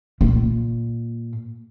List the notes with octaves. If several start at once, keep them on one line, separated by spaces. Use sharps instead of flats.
A#2